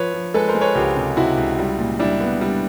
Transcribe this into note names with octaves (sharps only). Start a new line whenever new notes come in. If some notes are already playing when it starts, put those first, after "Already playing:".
Already playing: F3 B4 C#5
F3
G#3 A4 B4
A#4 C5
G#3
B4 C#5
C#2 F4 G4
C3
C3 E4 F#4
C#2
G3
A#2
G3 D4 E4
B3
G3